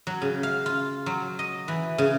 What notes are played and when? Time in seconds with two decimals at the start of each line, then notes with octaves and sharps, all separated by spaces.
0.07 F#3
0.22 C#3
0.43 F5
0.66 F4
1.06 F#3
1.39 D#5
1.68 E3
1.98 C#3